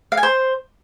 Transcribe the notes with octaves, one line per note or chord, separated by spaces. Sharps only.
F5
G#5
C5